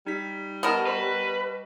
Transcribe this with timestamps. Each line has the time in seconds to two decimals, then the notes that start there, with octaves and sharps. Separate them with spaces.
0.07 G3 D#4 B6
0.63 B3 A#4 D#5 A5 C#6
0.87 B4